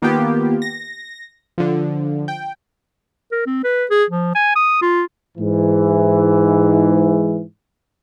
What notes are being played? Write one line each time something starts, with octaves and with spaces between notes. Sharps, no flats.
D#3 A#3 B3 F4 G4
A#6
D3 F3
G5
A#4
C4
B4
G#4
F3
G#5
D#6
F4
G#2 E3